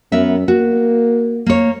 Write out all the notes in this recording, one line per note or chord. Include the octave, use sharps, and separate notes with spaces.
F#2 B3 A#4 E5
A#3 F#4
A#3 C#5